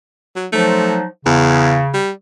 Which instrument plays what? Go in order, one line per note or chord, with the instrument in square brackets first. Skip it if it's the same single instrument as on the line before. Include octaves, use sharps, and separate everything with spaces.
[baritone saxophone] F#3
[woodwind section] F3 F#3 D#4 [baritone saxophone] A3
[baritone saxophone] E2 [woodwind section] C#3
[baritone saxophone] G3